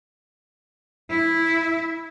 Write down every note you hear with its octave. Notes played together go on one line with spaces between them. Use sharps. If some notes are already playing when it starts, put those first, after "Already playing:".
E4